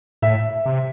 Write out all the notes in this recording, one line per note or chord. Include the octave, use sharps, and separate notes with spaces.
A2 E5
C3